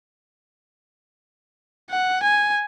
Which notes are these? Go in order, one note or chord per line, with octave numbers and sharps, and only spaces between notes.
F#5
G#5